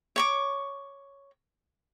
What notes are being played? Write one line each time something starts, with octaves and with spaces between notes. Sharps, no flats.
C#5 C#6 D6